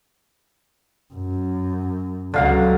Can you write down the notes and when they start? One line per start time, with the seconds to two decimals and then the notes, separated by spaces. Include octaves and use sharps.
1.14 F#2
2.34 C#2 D3 F#3 F5 A#5